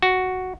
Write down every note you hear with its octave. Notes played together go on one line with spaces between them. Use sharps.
F#4